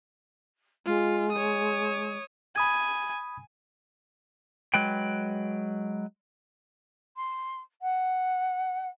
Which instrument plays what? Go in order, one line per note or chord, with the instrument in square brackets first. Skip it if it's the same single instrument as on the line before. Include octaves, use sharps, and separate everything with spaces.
[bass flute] G#3 [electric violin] F4
[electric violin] C#5 D#6
[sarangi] G#5 [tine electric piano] B5 D#6 G#6
[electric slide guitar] F#3 G#3 B4 G5
[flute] C6
F#5